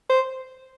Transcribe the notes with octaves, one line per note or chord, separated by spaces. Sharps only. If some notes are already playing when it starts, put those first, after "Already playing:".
C5